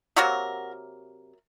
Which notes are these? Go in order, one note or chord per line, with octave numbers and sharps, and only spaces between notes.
C3 F#3 A#3 F#4 A#4